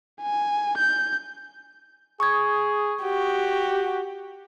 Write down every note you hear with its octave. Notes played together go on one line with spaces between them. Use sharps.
G#5
G6
G#4 C#6 D#6 G#6
F#4 G4